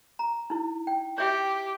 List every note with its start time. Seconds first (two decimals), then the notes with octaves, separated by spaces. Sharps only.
0.19 A#5
0.50 D#4 E4
0.87 G5
1.18 G4 C#5 E5 G5